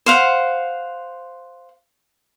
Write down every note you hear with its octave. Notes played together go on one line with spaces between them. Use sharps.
C5 F5 F#5